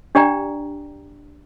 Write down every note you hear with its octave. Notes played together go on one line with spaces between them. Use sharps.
D4 G4 D5 G5 A#5